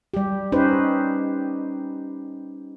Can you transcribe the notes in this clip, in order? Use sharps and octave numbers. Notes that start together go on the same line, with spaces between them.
G3 G4
C#4 D#4 G4 B4 C5